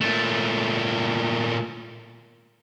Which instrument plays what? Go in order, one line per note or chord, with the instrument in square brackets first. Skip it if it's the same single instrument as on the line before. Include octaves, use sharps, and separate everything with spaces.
[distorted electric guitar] A#2 A3